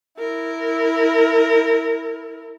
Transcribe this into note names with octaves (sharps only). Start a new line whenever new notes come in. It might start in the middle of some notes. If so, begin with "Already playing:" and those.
E4 A#4